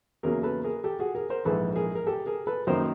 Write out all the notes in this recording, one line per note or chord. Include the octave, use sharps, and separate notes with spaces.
E2 C#3 F#3 A#3 G#4 A#4
A4 B4
G#4 A#4
G4 A4
F#4 G#4
G#4 A#4
A#4 C5
A#1 G#2 E3 G#3 A4 B4
G#4 A#4
A#4
G4 A4
G#4 A#4
A4 B4
F#2 D#3 F#3 A#3 A#4 C5